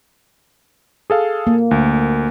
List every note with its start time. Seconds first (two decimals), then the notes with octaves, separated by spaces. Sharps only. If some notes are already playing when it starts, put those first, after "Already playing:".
1.10 G#4 A4 F5
1.47 A#3
1.71 D2